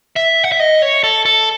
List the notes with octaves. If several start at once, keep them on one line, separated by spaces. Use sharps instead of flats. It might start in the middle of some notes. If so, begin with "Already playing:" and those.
E5
F#5
E5
D#5
C#5
A4
A4